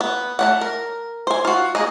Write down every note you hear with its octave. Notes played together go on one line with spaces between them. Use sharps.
B3
A3 C#4 F#5
A#4
C5 G#5
F4 F#4
A#3 G#4 D#5